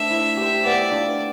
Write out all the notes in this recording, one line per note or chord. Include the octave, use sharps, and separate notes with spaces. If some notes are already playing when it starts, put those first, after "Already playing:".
Already playing: A3 D4 A4 C5 E5
E4
G4 C5
B3 D5
D4 F4